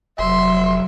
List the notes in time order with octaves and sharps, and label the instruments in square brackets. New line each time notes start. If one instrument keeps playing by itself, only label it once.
[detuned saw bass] F1 [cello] F#3 [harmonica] E5 [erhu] C6